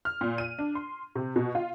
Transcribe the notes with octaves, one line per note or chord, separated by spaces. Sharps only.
F6
A#2
D#7
D4
C6
C3
B2
F4